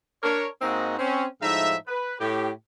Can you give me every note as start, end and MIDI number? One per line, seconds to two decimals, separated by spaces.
0.23 0.47 62
0.23 0.47 70
0.23 0.47 73
0.62 0.98 44
0.62 0.98 58
0.62 0.98 60
0.62 0.98 63
0.62 0.98 66
0.62 0.98 75
0.99 1.25 60
0.99 1.25 61
1.41 1.75 45
1.41 1.75 53
1.41 1.75 56
1.41 1.75 63
1.41 1.75 76
1.88 2.15 71
2.20 2.50 45
2.20 2.50 67